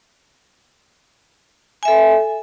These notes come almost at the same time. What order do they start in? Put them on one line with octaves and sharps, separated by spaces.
G#5 E5 A4